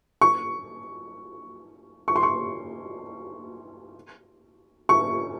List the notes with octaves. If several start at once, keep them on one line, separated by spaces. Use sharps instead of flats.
C#6
C#6
C6
C#6
C#6